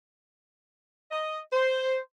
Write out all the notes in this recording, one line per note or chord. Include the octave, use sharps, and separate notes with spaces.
D#5
C5